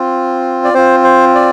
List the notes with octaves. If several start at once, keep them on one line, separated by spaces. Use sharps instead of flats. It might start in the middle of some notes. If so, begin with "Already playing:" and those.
Already playing: C4 F4
D5
C4 F4 C5
C5
D5